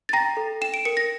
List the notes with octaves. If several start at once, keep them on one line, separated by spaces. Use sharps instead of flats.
A6
G5 A#5 A#6
A4
G5 E7
D7
A#4 C#7
A#6